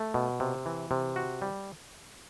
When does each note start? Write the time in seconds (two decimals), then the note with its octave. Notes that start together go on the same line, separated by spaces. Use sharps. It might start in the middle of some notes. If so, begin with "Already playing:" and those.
Already playing: A3
0.14 B2
0.40 C3
0.66 E3
0.91 C3
1.16 F#4
1.42 G3